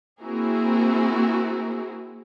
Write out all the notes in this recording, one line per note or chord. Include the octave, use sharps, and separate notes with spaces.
A#3 C4 E4 F#4 G#4 A#4